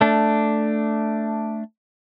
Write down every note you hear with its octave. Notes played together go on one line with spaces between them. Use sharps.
A3 D4